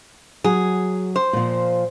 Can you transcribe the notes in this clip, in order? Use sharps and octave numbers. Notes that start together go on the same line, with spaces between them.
F#3 G#4
C5
A#2 F3